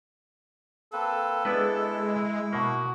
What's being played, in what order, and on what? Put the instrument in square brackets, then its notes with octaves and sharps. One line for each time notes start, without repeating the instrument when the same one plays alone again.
[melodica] A#3 C4 B4 [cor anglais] A4
[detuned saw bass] G#3 [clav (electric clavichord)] B3 D4 B4 [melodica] E4
[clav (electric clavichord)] B2 A#3 [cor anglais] F#4